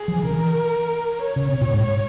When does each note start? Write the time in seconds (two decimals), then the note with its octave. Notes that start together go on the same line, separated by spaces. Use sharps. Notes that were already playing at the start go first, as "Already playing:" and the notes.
Already playing: G#4
0.08 F3
0.16 E3
0.23 C#3 A#4
0.30 E3
1.24 C#5
1.36 C#3
1.49 C3
1.61 A#2
1.73 G#2